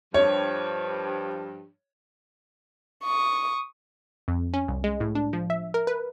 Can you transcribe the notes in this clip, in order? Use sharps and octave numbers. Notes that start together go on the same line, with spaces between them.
G2 F3 C#5
C#6 D#6
F2
C#4
C2
G#3
A2
D4
F3
E5
A#4
B4